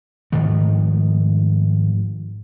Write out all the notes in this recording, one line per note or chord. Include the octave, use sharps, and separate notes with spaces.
G#2 D#3 F3 A3